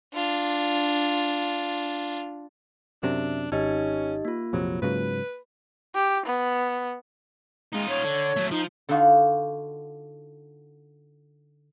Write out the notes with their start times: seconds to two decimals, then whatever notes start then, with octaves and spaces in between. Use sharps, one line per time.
0.14 D4 F4
3.03 F#2 C3 D4 E5
3.52 G#1 C#4 D#4 G4 D#5
4.25 A#3 F4
4.53 A#1 F2 C3 F#3
4.82 G#2 C#3 F#3 B4
5.95 G4
6.26 B3
7.73 G#3 D#4 F4
7.89 C#5
8.04 D3
8.36 F#3 A3
8.51 F3 D#4
8.89 D3 D4 D#4 F4 F#4